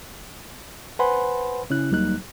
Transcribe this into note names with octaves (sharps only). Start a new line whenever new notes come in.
B4 C5 F#5 G#5 B5 C6
C#3 C#4 E4 F#6
D#2 F#3 G3 A#3 D#4 F#6